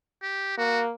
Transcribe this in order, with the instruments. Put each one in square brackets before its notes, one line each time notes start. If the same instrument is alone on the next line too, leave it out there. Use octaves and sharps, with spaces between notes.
[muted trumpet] G4
[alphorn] A#3 [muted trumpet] F#4